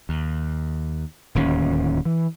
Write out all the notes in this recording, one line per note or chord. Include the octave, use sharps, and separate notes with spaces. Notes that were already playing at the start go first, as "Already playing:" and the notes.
D#2
D1 D#2 E3 C#4
E3